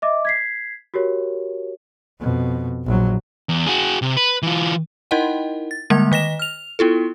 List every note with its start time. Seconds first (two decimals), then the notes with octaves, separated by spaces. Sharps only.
0.02 D#5 E5 D6
0.25 G#6 B6 C7
0.94 F#4 G4 A#4 C#5
2.19 F2 B2
2.85 A#1 F#3
3.49 E2
3.66 F#4 G#4
4.02 C3
4.17 B4
4.43 E3 F4
5.11 D#4 E4 A#4 D#5 F#5 G5
5.71 A6
5.90 D3 G3 G#3 A#3 A5 G#6
6.12 D#3 D#5 A#6 E7
6.39 F6 F7
6.79 B3 E4 F4 A4